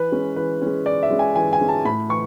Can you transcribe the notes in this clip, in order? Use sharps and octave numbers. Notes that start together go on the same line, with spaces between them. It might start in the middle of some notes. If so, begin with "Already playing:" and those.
Already playing: E3 B4
G#3 C#4
E3 B4
G#3 C#4
E3 D5
E5
G#3 C#4
G#5
E3 G#5
G#5
G#3 C#4
A5
A2 B5
E3 C#6